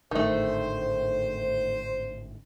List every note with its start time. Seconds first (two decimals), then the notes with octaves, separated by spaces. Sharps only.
0.11 G#1 A2 D3 D#3 A3 C5